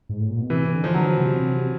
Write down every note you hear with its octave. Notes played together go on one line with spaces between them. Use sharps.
G#2
A2
A#2
B2
C3 E3
D3
F3
D3 F#3
C3
C3